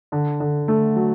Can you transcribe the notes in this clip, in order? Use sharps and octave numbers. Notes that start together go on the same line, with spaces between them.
D3
D3
A3
F#3